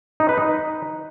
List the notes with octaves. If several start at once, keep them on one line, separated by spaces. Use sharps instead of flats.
D#4
B4
D#4